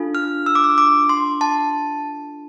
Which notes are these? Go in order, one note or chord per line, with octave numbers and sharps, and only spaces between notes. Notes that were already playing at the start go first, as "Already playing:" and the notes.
Already playing: D4 F4 A4
F6
E6
D6
E6
D6
C6
A5